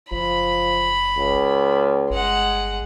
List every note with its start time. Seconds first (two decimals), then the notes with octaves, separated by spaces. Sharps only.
0.11 F#1 F3 B5
1.17 C#2
2.10 G1 G#3 F#5